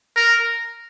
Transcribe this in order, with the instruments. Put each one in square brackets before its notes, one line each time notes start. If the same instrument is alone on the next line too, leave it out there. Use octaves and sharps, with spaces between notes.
[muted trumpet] A#4